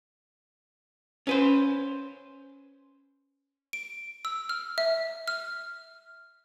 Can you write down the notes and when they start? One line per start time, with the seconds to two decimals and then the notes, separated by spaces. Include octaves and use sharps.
1.27 C#4 B4 C5
3.73 D7
4.25 E6
4.49 F6
4.78 E5
5.28 F6